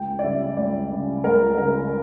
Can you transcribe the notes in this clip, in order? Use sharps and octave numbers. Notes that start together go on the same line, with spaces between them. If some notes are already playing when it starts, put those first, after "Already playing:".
Already playing: C#2 G5
D5
C#3 G3 E5
C#2 D5
C#3 G3
C#2 A#4
C#3 G3 A#4